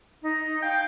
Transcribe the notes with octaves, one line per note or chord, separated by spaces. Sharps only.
D#4
F5 G5